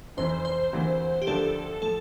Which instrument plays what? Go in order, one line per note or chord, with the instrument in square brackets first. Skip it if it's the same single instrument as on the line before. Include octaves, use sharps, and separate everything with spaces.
[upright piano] F1 F2 E3 [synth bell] C5
[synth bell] C5
[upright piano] D2 C3 E3 A#3
[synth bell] G4
[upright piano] D2 D3 F3 A#3 [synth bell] A4
[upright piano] A2 F3 [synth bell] A4